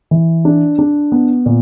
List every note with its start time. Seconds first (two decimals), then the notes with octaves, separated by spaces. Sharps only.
0.11 E3
0.45 D4
0.79 D4
1.12 B3
1.46 A#2